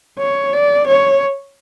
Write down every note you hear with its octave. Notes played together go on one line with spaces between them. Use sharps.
C#5
D5
C#5